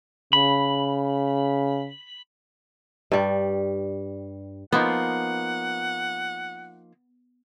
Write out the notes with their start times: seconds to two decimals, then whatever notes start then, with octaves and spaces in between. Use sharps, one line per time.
0.33 C#3 B5
3.12 G2 G3
4.72 F3 A#3 B3 D#4 F#5